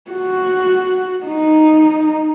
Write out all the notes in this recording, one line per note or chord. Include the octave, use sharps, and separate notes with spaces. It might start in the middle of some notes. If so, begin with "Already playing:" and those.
F#4
D#4